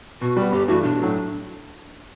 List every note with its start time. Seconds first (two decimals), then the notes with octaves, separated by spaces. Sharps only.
0.21 B2 F#4
0.37 G3 B3
0.52 G1 G4
0.68 G2 E3 A3 D4 F#4
0.83 B1 D4
0.99 A2 F#3 A3